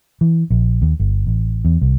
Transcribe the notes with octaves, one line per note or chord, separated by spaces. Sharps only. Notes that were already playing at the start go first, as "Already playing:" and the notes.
E3
A#1
D#2
G1
A1
E2
C2